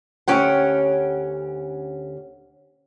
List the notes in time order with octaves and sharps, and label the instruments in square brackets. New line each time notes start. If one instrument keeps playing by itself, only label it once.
[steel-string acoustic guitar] D2 C#4 G4 F#5